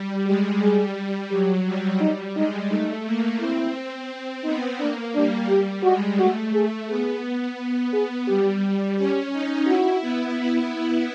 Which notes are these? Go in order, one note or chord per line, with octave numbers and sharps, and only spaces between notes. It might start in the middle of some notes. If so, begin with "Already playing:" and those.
Already playing: G3
G#3 G4
G3 G#4
F#3 G4
G3
G3 D#4
G#3 D#4
A3 D#4
A#3
C4 E4
B3 D#4
A#3 D4
G3 D4
G3 G4
G#3 F#4
A3 F#4
A3 G#4
B3 G#4
B3 G#4
G3 G4
C#4 G4
D#4
E4 F#4
B3